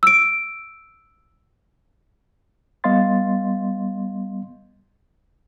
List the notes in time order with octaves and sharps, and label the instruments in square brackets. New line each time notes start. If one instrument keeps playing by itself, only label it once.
[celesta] E6 D7
[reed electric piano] G3 B3 D#5 F5 C6 A6